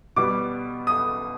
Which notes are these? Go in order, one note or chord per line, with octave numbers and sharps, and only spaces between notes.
B2 G3 B3 D6
D#6